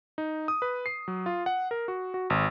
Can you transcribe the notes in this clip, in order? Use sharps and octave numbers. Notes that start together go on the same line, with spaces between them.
D#4
D#6
B4
C7
F#3
F4
F#5
A#4
F#4
F#4
G#1